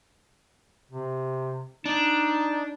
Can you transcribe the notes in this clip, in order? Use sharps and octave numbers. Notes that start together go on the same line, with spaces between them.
C3
D4 D#4